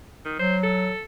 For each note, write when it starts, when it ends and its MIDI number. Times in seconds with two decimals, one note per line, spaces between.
0.25 0.36 51
0.39 0.92 54
0.39 0.56 72
0.63 1.01 69